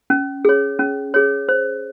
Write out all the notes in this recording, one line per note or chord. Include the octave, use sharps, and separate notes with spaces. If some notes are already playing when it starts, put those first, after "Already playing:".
C#4
G#4 C#5
C#4
G#4 C#5
C5